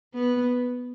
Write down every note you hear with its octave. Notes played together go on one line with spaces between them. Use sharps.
B3